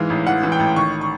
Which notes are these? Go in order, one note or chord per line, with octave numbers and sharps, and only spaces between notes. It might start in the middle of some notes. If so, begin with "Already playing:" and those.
Already playing: G#2 E3 F5
A1
E3 F#5
E3
G5
A1
D#3 C#6
C#6